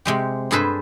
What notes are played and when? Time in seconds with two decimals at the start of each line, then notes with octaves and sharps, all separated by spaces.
0.05 C3 G#3 G4
0.51 G2 G#4 A4 B4 C5